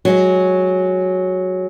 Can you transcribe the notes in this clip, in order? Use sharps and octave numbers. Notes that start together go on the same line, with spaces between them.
F#3 G#3